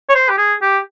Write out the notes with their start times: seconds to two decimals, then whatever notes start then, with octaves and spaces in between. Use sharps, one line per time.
0.09 C#5
0.15 C5
0.29 G4
0.38 G#4
0.62 G4